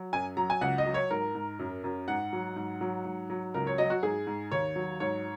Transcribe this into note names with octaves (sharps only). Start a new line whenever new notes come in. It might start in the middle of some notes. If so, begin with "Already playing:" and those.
Already playing: F#3
F#2 G#5
F#3 A#5
G#5
C#2 F#5
D#5
F#3
C#5
G#2 A#4
G#2
F#2
F#2
G#2 F#5
F#3
G#2
F#3
G#2
F#3
C#2 A#4
C#5
F#3 D#5
F#4
G#2 G#4
G#2
D#2 C#5
F#3
G#2 C#5